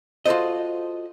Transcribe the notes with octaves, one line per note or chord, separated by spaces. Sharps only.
F4 F#4 A4 C5 D#5